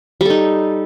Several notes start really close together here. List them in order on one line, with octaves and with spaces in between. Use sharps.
G3 A4 D#4